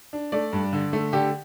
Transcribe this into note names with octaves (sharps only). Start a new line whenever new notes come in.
D4
A3 D5
G2
D3
A3
D3 G4